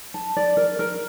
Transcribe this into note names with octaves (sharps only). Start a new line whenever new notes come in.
A5
D5
A#4
A#4